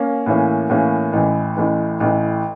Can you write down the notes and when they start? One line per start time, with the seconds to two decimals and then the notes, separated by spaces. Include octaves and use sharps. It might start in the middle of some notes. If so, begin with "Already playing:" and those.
Already playing: A#3 C#4
0.26 A2 E3 A#3 C#4
0.70 A2 E3 A#3 C#4
1.13 A1 A2 E3
1.57 A1 A2 E3
2.00 A1 A2 E3